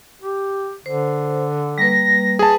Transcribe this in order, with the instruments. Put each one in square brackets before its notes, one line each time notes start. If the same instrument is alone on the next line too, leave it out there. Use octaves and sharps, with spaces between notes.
[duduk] G4
[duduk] D3 [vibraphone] C5
[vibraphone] G3 A#3 B4 [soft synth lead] A#6
[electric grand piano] G#4 A5 [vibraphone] B4